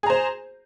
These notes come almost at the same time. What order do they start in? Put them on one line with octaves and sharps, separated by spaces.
G#4 A#5 C5